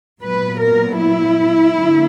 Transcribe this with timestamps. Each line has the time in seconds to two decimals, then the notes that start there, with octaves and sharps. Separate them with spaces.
0.22 A#2 F#3 B3 B4
0.60 A#4
0.98 E4
1.76 D3 F#3 A#3